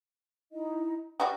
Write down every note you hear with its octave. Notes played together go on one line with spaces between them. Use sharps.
D#4 E4 D#5
G3 F#4 G5